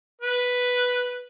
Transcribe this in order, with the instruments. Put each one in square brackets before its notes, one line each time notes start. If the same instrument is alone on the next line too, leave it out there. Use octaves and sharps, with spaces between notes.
[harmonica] B4